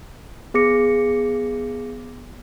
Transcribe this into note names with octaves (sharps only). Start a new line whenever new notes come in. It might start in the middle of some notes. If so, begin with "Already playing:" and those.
B3 G#4 D6 A#6 C#7